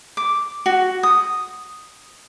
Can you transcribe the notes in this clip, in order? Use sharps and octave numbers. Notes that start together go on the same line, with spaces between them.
D6
F#4
D#6